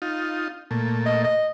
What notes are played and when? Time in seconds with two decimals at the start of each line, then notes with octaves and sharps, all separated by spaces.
0.02 D#4 F4
0.71 A#2 A3
1.06 D#5
1.24 D#5